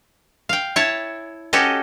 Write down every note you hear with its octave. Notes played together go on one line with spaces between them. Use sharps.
F5 G5
E4 C#5 A5
C#4 F#4 G4 A4 D#5